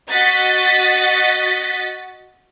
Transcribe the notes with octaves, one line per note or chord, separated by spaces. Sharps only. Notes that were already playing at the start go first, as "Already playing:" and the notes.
F#4 D#5 F#5 A6 B6